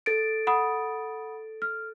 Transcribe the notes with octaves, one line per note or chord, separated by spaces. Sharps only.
A4 A6 D7
F#5 B5 D#6
F6